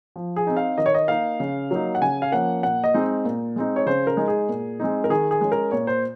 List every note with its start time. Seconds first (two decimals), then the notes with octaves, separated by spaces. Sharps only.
0.16 F3
0.36 G#4
0.47 C4 D#4
0.57 F5
0.78 D#3 D#5
0.86 C#5
0.94 D#5
1.08 A#3 D#4 F5
1.40 C#3
1.71 F#3 A#3 D#4
1.95 F#5
2.01 C#3 G#5
2.22 F5
2.32 F3 A#3 C#4 F#5
2.63 A#2 F#5
2.84 D#5
2.94 G#3 C4 D#4
3.25 A#2
3.56 G#3 C4 D#4
3.76 C#5
3.86 C#3 C5
4.07 A#4
4.17 G#3 D#4
4.28 G#4
4.49 A#2
4.80 G#3 C4 D#4
5.04 A#4
5.10 D#3 G#4
5.31 G#4
5.41 G#3 C#4
5.52 A#4
5.71 A#2 C#5
5.87 C5